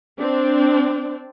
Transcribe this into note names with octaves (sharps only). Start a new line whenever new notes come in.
C4 D4